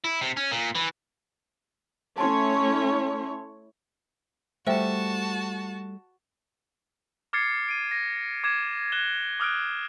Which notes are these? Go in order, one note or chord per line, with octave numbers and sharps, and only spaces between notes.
E4
C3
C#4
A#2
E3
A3 C#4 E4 C#5 A5 C6
G3 A3 F#4 C5 E5 G5 A5
D6 F6 G#6 A6 C7 C#7
D7 D#7
A#6
D6 G#6 E7
F#6 G#6 E7 G7
D6 D#6 F6 F#6 D7